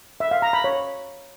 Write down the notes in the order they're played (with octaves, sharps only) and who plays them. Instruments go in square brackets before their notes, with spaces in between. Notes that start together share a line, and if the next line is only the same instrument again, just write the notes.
[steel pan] E5
F5
A#5
B5
C#5